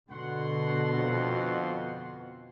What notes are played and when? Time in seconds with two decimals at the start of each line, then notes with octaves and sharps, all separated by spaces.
0.10 B2 D3 F#5 C6
0.94 F2